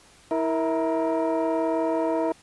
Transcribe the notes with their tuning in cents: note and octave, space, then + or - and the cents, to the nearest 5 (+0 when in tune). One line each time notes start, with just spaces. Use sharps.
E4 -25 A#4 +5